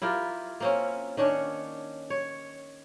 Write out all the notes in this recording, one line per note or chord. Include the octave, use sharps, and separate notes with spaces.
E4 F4 G4 A#4
A#3 C4 C#4
D#3 C#4 D4 C#5
C#5